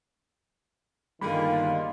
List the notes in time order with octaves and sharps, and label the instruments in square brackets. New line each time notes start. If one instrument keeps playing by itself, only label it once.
[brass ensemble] G1 D#3 F4 [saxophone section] D3 A#3 [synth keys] G3 G#4 [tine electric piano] B5